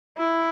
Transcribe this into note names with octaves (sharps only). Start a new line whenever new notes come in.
E4